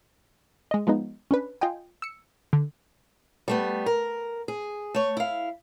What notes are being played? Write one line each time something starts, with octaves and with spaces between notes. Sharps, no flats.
G#3 D#5
F3 G#3 B3 D#4
C#4 D4 B4
F4 D#5 G5 G#5
E6 C#7
D3
G3 A3 B3
A#4
G#4
A3 C#5
E4 F5